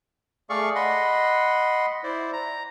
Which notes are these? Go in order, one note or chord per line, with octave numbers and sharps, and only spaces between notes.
A3 G#4 D5 F5 C#6
D#5 F#5 B5 C6
E4 C5 D5
A#5